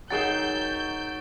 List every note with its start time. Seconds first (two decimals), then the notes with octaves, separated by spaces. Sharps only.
0.10 D#3 F#3 G#4 F#5 G6 A6 D7 E7